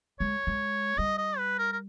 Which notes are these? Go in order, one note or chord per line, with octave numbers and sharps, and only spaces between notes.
G#3 C#5
G#3
G3 D#5
D#5
B4
A#4
A#4